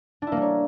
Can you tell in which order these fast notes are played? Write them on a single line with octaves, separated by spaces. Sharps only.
D4 E4 A#3 G3 C#5